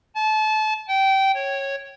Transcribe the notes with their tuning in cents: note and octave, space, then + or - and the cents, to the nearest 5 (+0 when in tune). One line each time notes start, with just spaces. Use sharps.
A5 -30
G5 -20
C#5 -10